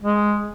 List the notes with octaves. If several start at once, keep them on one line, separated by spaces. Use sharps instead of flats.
G#3